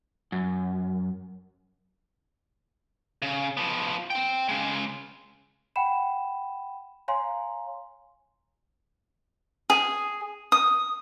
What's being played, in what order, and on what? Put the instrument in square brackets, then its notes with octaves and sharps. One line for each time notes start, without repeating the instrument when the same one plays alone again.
[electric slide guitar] F#2
[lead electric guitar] C#3
F3 B3
C4 G5
C#3 G#3
[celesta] F#5 G5 B5 E7
C#5 F5 G#5 A#5 C6
[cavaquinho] G#4
D#6